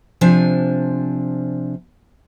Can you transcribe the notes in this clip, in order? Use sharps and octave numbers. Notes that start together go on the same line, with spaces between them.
C3 F3 D4 G#5